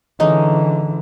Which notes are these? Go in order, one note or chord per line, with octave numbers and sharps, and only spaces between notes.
D3 E3 G#3 C#4 D#4